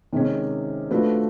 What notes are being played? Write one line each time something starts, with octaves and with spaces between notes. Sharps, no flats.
C3 D#3 G#3 C#4
F3 A3 D4 F#4 B4